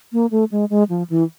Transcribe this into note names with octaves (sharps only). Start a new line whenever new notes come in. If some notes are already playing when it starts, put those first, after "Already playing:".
A#3
A3
G#3
G#3
F3
E3